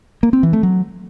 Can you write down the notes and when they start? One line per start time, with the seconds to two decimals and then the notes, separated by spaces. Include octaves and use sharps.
0.23 A#3
0.33 C4
0.43 E3
0.53 A3
0.63 F#3